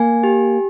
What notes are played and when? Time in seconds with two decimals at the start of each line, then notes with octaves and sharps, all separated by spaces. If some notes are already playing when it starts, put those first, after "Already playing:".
Already playing: A#3 G#5
0.23 G4